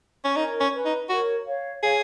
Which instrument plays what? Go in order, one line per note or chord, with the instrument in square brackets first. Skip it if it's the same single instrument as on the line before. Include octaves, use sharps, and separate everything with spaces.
[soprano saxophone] C#4
[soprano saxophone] D#4 [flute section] A#4 C#5
[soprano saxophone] C#4
[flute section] B4
[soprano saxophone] D#4
[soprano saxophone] F#4 [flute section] A#4 C#5
[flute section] C#5 F5
[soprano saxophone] G#4 [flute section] C#5 F5